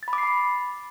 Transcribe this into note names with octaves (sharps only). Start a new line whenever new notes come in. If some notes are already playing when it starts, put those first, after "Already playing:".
A6
B5
D6
C7
B5